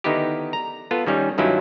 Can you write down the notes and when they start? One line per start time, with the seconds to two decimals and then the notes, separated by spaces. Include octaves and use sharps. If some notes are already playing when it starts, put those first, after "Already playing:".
0.04 D3 D#3 B3 D#4 E4 G4
0.53 A#5
0.91 B3 F4 A4
1.07 D#3 G3 C#4
1.38 G2 D#3 F#3 C#4 E4 F4